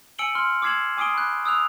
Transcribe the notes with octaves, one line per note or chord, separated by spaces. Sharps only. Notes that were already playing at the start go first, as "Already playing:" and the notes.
G#5 E6 C#7 D7 F#7 G7
C6 F6
D6 E6 G#6 C7 E7 F#7
G#5 D6 D#6 C7 D7 G7
B5 F#6
D#6 E6 F#6 F7